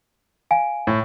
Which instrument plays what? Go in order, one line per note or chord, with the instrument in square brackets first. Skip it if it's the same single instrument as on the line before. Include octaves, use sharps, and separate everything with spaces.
[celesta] F5 G#5 D7
[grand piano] A2